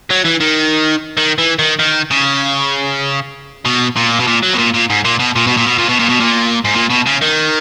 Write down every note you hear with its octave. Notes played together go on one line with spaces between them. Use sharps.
F#3
E3
D#3
D#3
E3
D#3
D#3
C#3
B2
A#2
B2
A#2
F#3
B2
A#2
A#2
G#2
A#2
B2
A#2
B2
A#2
B2
A#2
B2
A#2
B2
A#2
G#2
A#2
B2
C#3
D#3